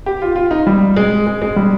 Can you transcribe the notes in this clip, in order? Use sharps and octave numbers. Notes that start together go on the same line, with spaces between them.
G4
F4
F4
D#4
G3
G#3
G#3
G#3
G3